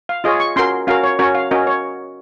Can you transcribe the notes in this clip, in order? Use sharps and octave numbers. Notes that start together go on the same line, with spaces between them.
F5
F4 G#4 C#5 D#5
C#6
C#4 F#4 A#4 C6
C#4 F#4 A#4 F5
C#5
C#4 F#4 A#4 C#5
F5
C#4 F#4 A#4 D#5
C#5